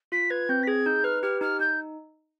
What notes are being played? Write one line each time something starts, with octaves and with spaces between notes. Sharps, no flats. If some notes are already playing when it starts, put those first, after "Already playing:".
F4 B6
B4 G#6
C4 G6
B6
G#4 G#6
D#4 G6
B4 F6
G4 F6
D#4 F6
D#4 G6